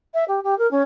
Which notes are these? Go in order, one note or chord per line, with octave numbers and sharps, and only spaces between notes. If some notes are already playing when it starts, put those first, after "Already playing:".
E5
G4
G4
A#4
C#4